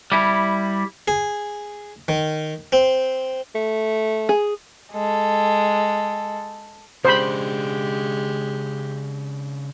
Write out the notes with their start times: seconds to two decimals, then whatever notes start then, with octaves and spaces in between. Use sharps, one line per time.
0.12 G3 E4
1.08 G#4
2.08 D#3
2.72 C4
3.55 A3
4.29 G#4
4.92 G#3 A4
7.05 C#3 G#3 D4 G4 C5 B5